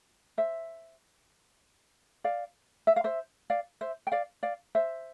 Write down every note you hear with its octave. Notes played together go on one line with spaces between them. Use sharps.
C5 E5
D5 F5
E5
F5
C5 E5
D5 F5
C5 E5
G5
D5 F5
D5 F5
C5 E5